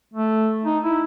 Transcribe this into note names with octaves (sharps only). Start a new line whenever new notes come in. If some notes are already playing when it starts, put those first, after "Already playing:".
A3
D#4
E4